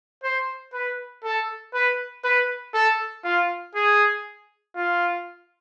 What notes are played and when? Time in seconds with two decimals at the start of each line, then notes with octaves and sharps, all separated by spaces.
0.24 C5
0.73 B4
1.24 A4
1.74 B4
2.24 B4
2.74 A4
3.24 F4
3.75 G#4
4.76 F4